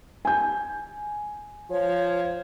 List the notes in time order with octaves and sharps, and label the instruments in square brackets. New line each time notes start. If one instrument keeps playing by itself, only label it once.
[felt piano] G#5 G6
[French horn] F3 [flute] C#5